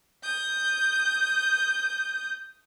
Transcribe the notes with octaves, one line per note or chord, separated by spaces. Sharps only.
D#6 G6